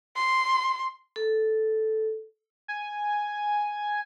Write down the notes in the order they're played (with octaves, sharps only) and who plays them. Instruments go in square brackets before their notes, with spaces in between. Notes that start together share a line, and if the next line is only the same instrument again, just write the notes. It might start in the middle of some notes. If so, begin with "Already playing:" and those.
[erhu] C6
[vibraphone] A4
[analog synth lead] G#5